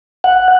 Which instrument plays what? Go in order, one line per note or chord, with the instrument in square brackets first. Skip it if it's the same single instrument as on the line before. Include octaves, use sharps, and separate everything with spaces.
[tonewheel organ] F#5